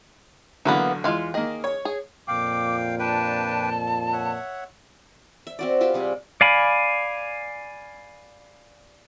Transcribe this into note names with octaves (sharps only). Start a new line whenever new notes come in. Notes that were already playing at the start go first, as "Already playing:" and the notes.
A1 D3 E3 F#3 A#3 B3
E2 G#3 F4 G#5
D#3 A#3 G#4 D#5
C#5
G#4
F2 A#2 F5 G5 D6
D4 B4 G5 A5
C#5 E5 F#5
E5
C4 F#4 D5
F4 G4 B4 C5
C3 G3 G#4
D5 F5 G#5 B5